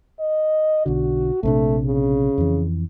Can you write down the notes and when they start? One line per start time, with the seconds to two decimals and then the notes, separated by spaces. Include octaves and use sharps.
0.19 D#5
0.86 B1 D3 F#4
1.43 A#1 C3 A3 D4
1.86 C#3
2.38 F2 E3